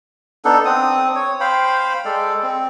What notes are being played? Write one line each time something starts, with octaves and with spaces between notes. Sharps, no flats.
B3 D4 D#4 A4
C4 D#6
C#5
C5 F5 G5 B5
G#3 A4 D5
C4